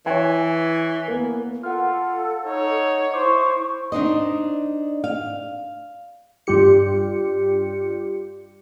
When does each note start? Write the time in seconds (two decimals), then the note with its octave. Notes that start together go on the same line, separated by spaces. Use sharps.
0.06 E3 C#5 G#5
1.08 A#3 B3
1.63 F4 A4 F#5 F6
2.45 D#4 C#5
3.14 E4 C5 C#6 D6
3.92 D4 D#4 C5 D#5
5.04 F5
6.47 G2 G3 F4 G4 C#7